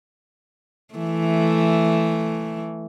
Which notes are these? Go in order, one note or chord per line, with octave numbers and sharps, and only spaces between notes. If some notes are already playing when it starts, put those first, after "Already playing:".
E3 A3